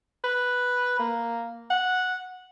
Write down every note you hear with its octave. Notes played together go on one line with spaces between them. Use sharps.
B4
A#3
F#5